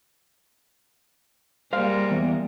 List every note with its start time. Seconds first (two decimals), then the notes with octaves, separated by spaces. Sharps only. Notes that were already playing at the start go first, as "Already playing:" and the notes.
1.73 G3 G#3 A#3 C5 F5
2.11 E2